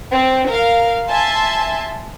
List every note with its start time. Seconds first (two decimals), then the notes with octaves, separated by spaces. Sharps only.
0.13 C4
0.50 A#4 F5
1.08 E5 G#5 A5 C6